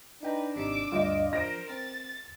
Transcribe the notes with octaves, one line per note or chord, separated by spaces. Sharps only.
D4 D#4 B4 G5 A#5
G#1 C3 D#4 D6 E6
D2 G2 F4 D5 D#5
F3 A#4 C5 A#6 D7
C4 A6